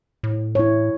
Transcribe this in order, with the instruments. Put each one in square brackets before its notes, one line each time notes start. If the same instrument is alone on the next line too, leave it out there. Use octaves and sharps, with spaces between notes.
[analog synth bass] A2
[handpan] E4 C#5